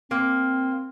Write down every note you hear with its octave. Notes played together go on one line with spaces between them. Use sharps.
A#3 C4